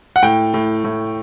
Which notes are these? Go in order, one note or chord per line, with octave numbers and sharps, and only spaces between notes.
F#5
A2 G5
A2
A2